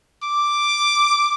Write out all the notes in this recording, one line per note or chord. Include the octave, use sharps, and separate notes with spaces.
D6